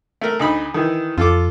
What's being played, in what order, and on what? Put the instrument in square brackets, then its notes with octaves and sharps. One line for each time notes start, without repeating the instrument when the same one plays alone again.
[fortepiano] A3 A#4
D2 D#4 B5
D#3 E3
[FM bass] F2 [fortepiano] F4 A4 D6